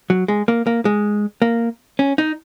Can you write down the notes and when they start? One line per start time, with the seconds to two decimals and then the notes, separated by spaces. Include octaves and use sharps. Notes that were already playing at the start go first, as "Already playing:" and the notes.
0.10 F#3
0.28 G#3
0.48 A#3
0.67 A#3
0.85 G#3
1.42 A#3
1.99 C#4
2.18 D#4